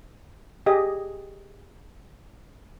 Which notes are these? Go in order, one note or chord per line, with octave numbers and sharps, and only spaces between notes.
G4 G#4 D#5